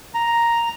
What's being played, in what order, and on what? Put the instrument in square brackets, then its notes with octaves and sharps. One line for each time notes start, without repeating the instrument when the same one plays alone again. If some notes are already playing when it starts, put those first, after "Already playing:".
[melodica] A#5